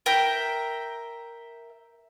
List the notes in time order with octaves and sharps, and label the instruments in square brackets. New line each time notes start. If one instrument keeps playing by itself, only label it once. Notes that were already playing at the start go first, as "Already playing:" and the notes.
[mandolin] A#4 E5 G5